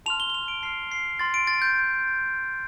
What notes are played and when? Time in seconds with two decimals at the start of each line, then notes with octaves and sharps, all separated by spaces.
0.06 A5 C6 F6 F7
0.20 G7
0.30 G7
0.35 F7
0.48 D7
0.62 A5 C6 F6 C7
0.92 C7
1.19 A5 C6 F6 A6
1.34 D7
1.47 A6
1.62 G6